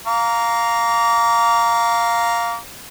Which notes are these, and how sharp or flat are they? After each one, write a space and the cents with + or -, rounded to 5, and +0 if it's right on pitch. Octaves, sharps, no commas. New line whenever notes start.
F5 +0 A#5 +0 D6 -35